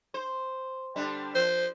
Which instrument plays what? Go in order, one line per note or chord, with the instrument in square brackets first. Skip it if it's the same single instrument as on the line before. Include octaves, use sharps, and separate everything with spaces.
[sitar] C5
D3 G3 D4
[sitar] F3 [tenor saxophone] C5